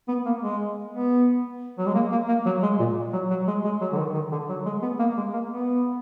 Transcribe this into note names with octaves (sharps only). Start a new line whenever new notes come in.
B3
A#3
G#3
B3
F#3
G#3
A#3
A#3
A#3
F#3
G#3
A#2
F#3
F#3
G#3
G#3
F#3
D3
D#3
D#3
D3
F#3
G#3
B3
A#3
G#3
A#3
B3